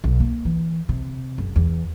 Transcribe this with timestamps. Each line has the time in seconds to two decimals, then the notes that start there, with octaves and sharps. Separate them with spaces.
0.04 B1
0.20 A#3
0.45 E3
0.89 C3
1.38 F#1
1.56 E2